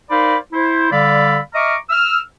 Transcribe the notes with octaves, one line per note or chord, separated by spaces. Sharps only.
D#4 A#4 C5 D5 F5 B5
E4 C5
D3 G3 D5 F5 B5 E6
D#5 E5 A#5 C#6 D6 F6
E6 F6